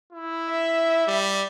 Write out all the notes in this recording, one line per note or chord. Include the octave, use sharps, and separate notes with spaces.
E4
E5
G3